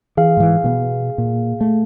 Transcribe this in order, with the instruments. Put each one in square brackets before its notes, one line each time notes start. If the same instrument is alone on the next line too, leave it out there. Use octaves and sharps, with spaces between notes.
[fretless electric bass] E3 [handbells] G#4 F5
[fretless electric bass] G#2 E3
B2 G#3 B3
A#2
A3